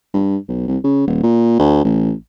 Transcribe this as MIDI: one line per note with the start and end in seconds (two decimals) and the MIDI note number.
0.14 0.37 43
0.49 0.64 35
0.68 0.78 36
0.84 1.07 49
1.07 1.20 27
1.23 1.58 46
1.59 1.84 38
1.85 2.12 33